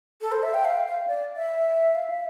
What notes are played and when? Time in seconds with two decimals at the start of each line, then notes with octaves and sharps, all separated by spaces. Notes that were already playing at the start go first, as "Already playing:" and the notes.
0.21 A4
0.32 C5
0.43 E5
0.54 G5
0.65 F5
0.86 F5
1.07 D5
1.36 E5
1.95 F5
2.10 E5